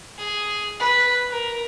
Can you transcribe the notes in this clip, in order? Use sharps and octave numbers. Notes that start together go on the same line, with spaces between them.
G#4
B4
A#4